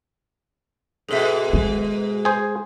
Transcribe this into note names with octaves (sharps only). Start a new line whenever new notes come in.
G#2 B2 G#4 A4 E5
G#3
G#4 C5